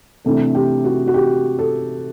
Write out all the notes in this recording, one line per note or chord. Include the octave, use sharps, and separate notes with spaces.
C3 E3 A3 D4 A4
G4
F#4
F#4
G4
A4